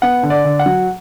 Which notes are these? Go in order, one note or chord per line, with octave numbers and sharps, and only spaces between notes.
B3 F#5
D3
D5
D3
F#5
F#3